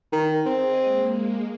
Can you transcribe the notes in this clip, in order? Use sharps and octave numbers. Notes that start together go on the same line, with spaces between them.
D#3
C4 G#4 D#5
G#3 A#3